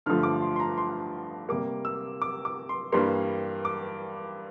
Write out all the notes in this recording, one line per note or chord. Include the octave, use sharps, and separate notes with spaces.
G2 D3 F3 A3 F6
D6
C6
C6
A#5
C6
C3 G3 A#3 D6
E6
D6
D6
C6
G2 E3 G3 A#3 C6
D6